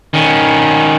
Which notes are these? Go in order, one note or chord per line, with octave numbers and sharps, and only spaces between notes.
D#3 C#4